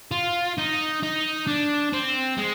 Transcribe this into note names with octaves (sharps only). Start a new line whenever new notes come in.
F4
D#4
D#4
D4
C4
G#3